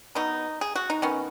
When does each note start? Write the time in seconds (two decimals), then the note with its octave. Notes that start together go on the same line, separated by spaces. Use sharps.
0.15 B2 F#3 B3 D#4
0.61 G#4
0.75 F#4
0.90 D#4
1.02 D#3 B3 C#4